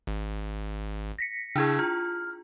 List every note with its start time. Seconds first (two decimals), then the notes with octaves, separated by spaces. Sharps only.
0.07 G#1
1.19 A#6 B6 C#7
1.56 C#3 D4 E4 G#4 E6 G#6
1.79 F4 F6